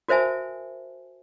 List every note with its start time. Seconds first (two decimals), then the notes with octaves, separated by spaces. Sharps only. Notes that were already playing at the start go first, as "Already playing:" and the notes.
0.08 F#4 A#4 C5 E5 G#5 A5